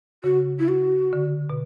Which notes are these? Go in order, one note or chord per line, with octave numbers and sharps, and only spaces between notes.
C#3 F#4
E4
F#4
D3
B2